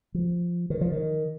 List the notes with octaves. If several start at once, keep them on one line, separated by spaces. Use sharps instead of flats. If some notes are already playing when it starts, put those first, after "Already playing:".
F3
D#3
F3
D#3